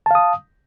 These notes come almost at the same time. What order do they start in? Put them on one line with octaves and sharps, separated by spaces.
A5 F5 D#6